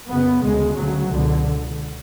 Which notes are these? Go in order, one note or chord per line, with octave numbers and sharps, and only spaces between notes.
F#2 C#3 B3
D2 C#3 G#3
D2 C#3 F#3
C#2 B2 D3